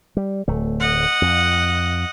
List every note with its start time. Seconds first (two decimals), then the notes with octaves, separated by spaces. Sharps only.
0.17 G3
0.48 D1 A3
0.80 D#5 F#5
1.22 F2